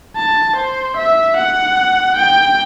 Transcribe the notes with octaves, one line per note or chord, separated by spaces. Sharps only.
A5
C5
E5
F#5
G5